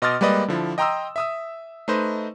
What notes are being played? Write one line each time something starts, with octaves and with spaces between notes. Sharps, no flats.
B2 D#5 C6 D6 F6 A6
G3 G#3 A#3 B4 D5 D#5
D3 F3 E4
D#5 G5 A#5 C6 D#6 E6
E5 D#6 E6
A3 D#4 B4 C5 D#5